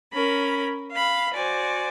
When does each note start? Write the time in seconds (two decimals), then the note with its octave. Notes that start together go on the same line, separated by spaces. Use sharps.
0.12 C#4 A#4 B5
0.91 F5 B5
1.32 F#4 C5 D5 G#5